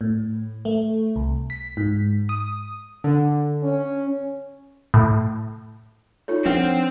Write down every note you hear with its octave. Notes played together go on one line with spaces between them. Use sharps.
A2
A3
C2
B6
G#2
D#6
D3
C#4
A2
D#4 F4 A4 C#5
F3 C4 D4 B4 F#5 G5